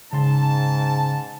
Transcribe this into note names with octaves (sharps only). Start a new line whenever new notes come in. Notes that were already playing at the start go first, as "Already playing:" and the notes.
G#2 C#3 A5 C6